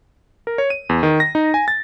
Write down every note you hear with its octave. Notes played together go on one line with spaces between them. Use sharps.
A#4
C#5
D#7
E2
D#3
A#6
D#4
G#5
A6